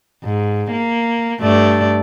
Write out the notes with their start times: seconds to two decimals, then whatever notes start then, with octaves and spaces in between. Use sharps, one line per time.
0.24 G#2
0.71 A#3
1.41 G2 A3 D5